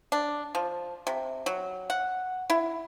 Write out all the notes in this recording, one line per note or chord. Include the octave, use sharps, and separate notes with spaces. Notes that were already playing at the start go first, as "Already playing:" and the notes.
D4
F3
C3
F#3
F#5
E4